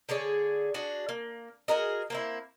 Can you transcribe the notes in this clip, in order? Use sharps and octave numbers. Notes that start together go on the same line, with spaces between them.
D3 G#4 C#5 D5
D4 F#4 G#4
A#3
F#4 G#4 A#4 D#5
A#3 C4 E4